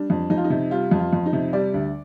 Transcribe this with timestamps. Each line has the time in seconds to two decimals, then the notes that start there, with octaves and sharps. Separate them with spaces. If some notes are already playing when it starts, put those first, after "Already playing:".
Already playing: G3 D4
0.10 F2
0.30 F2 D#4
0.37 F4
0.44 D#4
0.50 C3
0.71 G3 F4
0.91 F2
0.99 F4
1.13 F2
1.26 D#4
1.33 C3
1.53 G3 D5
1.74 D2